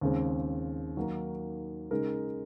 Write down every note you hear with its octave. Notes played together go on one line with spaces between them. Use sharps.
D#2 C#3 G#3 C4
D#3 F#3 A#3 D#4 A#4
C#3 G#3 D#4 A#4